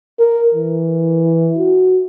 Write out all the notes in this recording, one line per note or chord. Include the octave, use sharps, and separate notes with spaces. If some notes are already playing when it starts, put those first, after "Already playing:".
A#4
E3
F#4